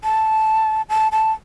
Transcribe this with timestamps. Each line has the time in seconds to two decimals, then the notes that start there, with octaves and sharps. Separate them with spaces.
0.04 A5
0.89 A5
1.12 A5